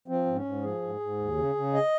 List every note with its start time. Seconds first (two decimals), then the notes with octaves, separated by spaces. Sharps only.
0.08 F3 C4
0.26 G#2
0.35 C#4
0.45 G#2
0.63 F3 G#4
0.82 G#2
1.00 G#2
1.19 D#2
1.37 C#3
1.55 C#3
1.74 D#5